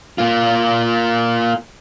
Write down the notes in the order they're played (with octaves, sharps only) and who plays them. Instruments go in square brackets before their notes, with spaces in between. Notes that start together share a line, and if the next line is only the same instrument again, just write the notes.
[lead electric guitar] A#3 F4